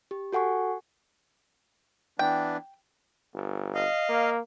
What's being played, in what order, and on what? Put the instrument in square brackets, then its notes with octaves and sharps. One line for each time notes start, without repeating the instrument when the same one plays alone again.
[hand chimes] G4
F#4 A4 F#5 G#5 C#6
[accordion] E3 B3 D4 [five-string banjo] G5
[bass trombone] G1
[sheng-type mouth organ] D#5 F5
[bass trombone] A#3